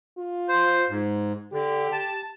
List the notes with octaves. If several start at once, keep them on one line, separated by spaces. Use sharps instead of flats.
F4
C5
G#2
D3 G4
A5